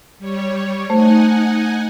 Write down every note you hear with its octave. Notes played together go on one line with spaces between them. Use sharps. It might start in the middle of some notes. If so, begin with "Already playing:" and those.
G3 C#5
A3 D#4 C5 F#5 G#5